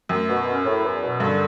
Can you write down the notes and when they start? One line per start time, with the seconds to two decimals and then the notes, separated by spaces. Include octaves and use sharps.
0.09 F#2 A3
0.28 B2
0.47 C#4
0.65 A2
0.84 E2
1.02 B2
1.20 G2 D3